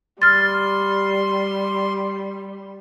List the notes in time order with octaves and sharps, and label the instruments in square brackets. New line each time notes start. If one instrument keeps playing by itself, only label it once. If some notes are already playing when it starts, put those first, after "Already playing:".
[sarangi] G3 [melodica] C6 [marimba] F6 A6